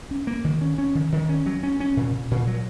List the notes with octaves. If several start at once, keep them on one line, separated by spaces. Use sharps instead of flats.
C#4
A#3
D#3
C#4
C#4
D#3
D#3
C#4
F#3
C#4
C#4
A#2
A#2
A#2
F#3